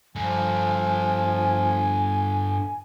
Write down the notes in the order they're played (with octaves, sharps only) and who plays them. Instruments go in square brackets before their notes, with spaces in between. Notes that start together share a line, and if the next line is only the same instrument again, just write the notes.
[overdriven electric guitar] G2 D3 [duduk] F3 [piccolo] G#5